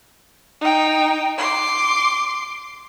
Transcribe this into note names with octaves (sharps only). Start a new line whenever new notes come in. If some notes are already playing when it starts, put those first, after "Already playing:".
D#4 G5
C6 D6